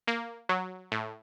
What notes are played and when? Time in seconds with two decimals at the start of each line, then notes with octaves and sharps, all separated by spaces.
0.08 A#3
0.49 F#3
0.92 A2